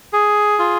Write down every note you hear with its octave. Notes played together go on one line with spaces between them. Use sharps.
G#4
F4